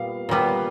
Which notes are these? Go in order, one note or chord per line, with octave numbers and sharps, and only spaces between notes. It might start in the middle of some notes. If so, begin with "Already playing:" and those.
Already playing: A#2 G3 B3 F5
A#2 G3 B3